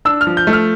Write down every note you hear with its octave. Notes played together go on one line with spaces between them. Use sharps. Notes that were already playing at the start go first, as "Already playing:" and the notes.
D4 E6
F6
F3
G6
A3
F6